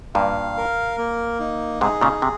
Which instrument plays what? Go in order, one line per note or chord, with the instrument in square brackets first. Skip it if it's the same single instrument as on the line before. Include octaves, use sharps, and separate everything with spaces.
[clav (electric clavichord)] G2 A#2 [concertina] F5
[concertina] A#4
A#3
D#4
[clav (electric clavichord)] G#2 C3 [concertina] G#4
[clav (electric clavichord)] A#2 C#3
C3